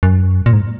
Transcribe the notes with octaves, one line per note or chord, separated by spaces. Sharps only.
F#2
A#2
G#2